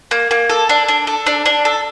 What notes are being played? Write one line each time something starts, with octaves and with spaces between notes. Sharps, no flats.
A#3
A#3
A4
D4
D4
A4
D4
D4
A4